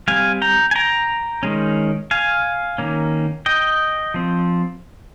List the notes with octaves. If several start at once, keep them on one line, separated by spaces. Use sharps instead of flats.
G3 C4 F5 G#5
G5 A#5
G#5
G5 A#5
D#3 G#3 C#4
F5 G#5
D#3 A#3 C#4
D#5 G5
F3 C4